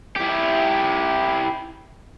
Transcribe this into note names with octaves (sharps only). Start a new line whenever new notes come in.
E4 G4